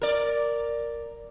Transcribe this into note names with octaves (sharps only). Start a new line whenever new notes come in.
A#4 D5